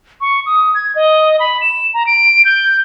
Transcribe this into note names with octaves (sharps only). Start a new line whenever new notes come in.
C#6
D#6
G#6
D#5
B5
E7
A#5
D7
G6